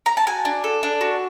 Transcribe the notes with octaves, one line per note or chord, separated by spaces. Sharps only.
A#5
A5
F#4 G#5
D4
A4
D4
F#4